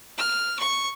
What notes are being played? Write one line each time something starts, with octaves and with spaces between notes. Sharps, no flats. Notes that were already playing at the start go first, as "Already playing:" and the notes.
F6
C#6